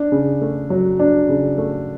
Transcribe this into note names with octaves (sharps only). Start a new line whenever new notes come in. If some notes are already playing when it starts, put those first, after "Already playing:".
Already playing: D4
C#3
A3
F#3
D4
C#3
A3